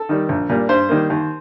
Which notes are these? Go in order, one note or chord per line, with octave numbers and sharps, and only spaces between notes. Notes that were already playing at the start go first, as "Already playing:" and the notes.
Already playing: A4
D#3 G3
A#1
A#2 G3 A#3
G2 C5
D#3 G3 A#3
D#2